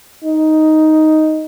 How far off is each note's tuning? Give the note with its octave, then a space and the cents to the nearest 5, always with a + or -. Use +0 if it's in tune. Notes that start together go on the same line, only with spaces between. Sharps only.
D#4 +5